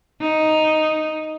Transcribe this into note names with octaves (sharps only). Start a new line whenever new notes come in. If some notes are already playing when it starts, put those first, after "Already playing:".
D#4